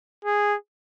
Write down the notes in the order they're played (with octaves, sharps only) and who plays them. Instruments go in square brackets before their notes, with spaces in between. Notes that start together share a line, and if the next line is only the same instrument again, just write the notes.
[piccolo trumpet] G#4